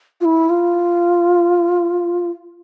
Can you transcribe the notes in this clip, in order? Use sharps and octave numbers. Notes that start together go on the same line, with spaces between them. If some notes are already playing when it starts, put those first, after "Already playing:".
F4
E4
F4